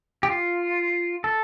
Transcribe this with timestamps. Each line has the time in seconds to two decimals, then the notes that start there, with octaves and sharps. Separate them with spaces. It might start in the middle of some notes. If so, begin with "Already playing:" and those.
0.23 G4
0.30 F4
1.24 A4